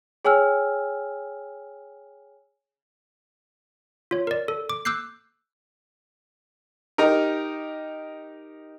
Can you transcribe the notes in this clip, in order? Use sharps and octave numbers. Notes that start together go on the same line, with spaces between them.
G#4 C#5 G5 G#5 E6 F6
F4 C#5
A#4 D5
A4
D6
D6 E6 F#6 G6 C7
D#4 G4 A#4